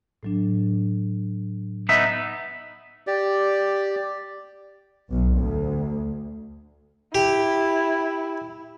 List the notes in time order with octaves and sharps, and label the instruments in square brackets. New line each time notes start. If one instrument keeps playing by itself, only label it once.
[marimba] A2 F#3 D4
[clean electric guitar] B3 D#4 E5
[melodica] G4 D5
[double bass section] B1
D2
[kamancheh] E4 [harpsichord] G4